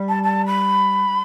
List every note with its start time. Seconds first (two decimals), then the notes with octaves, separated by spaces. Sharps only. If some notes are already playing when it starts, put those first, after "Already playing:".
Already playing: G3
0.09 A5
0.23 A5
0.46 B5